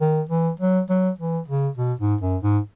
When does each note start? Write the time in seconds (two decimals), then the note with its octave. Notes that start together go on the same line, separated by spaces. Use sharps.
0.01 D#3
0.30 E3
0.60 F#3
0.90 F#3
1.19 E3
1.48 C#3
1.78 B2
2.00 G#2
2.21 F#2
2.43 G#2